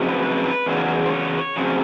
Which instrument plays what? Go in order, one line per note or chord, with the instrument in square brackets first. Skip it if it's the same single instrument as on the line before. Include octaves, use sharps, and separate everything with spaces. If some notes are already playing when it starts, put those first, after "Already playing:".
Already playing: [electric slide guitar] F2 C#3 F#3
B4
B4
E2 C#3 F#3
C5
C#5
F2 C#3 F#3